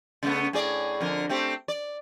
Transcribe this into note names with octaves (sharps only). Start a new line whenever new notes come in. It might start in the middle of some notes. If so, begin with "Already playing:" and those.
C#3 A3 B3
A2 G#4 D5
F2 D3 A#4
A3 C4 G4
D5